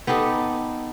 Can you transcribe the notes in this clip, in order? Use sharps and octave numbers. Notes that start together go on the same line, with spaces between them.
B3 D#4 G4 A4